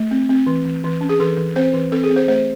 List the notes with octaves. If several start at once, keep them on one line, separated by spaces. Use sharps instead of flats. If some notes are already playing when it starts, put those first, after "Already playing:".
Already playing: A3
C4
C4
E3
E3
E3
C#4
G#4
E3 A4
E3
C4 C5
E3
C4 A4
G#4
C4
C5
A3 C5